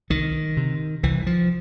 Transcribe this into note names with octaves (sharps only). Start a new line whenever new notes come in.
C2 D#3
C3
C2 E3
F3